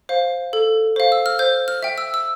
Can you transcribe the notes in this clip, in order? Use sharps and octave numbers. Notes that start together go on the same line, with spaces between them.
C5 F5
A4
C5 F5
E6
F6
C5 G6
F6
E5 G5
E6
E6